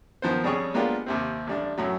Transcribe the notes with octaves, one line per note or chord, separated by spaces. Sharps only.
D#3 F3 B3 C5
F2 G3 C#4 G#4 C#5 G5
G#3 A#3 B3 D4 F4 G4
D#2 C3 C4
A1 G3 D4
F#2 A2 F#3